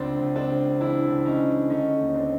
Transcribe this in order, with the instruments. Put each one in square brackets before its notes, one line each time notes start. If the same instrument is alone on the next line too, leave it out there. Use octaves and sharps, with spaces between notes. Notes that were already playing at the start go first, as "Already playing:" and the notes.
Already playing: [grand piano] C#2 C4 D4
C#2
C4 D4
C#3
E3 D4 E4
C#2
C#4 D#4
C#2
D3 C#4 D#4
D#2
C4 D4